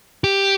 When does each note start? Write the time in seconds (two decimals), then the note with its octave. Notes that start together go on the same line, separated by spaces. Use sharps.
0.24 G4